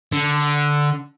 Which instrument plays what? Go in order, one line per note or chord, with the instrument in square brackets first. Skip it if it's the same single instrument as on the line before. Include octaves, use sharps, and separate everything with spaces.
[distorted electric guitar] D3